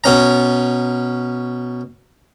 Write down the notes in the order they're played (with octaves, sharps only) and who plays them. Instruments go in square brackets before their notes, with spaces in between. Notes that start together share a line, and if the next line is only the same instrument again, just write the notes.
[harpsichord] B2 C#4 A#5